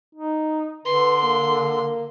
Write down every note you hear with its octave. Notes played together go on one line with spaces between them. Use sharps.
D#4
D3 B4 C6
A#3